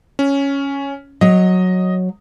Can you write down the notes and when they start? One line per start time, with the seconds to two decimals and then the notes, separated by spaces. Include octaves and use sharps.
0.19 C#4
1.21 F#3 C#5 D#5